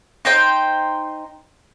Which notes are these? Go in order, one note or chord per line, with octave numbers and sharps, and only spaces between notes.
D#4 C5 G5